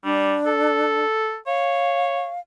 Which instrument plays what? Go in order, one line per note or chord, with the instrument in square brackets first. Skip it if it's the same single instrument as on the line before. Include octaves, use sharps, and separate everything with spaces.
[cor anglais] G3 [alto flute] D4
[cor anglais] A4
[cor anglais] C#5 [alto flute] F5